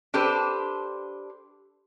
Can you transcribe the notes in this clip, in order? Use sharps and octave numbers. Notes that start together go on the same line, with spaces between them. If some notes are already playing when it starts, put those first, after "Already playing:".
D4 G4 A4 B4 C5